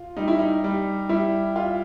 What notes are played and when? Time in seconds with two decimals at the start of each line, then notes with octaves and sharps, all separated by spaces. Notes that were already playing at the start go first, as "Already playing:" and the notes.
Already playing: F4
0.17 G3 D#4
0.28 E4
0.39 D#4
0.64 G3
1.09 G3 E4
1.56 F4